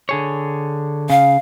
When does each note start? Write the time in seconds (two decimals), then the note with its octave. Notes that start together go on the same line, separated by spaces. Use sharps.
0.09 D3 G#4 C#5
1.10 C#3 F5